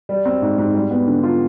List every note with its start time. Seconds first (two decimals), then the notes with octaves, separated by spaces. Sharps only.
0.09 G3
0.25 C4
0.42 G#2
0.58 G#2
0.74 G3
0.91 B3
1.07 D3
1.23 F4